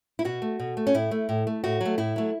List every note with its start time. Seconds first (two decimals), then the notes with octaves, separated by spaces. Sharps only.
0.19 E4
0.25 B2 F#4
0.42 A3
0.59 B2
0.77 A3
0.87 C#4
0.94 A2 E4
1.11 A3
1.29 A2
1.47 A3
1.64 A2 F#4
1.81 F#3 A3
1.98 A2 E4
2.16 F#3 A3